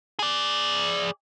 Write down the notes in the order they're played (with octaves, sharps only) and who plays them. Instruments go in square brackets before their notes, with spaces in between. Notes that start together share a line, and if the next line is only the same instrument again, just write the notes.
[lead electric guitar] G#4 D5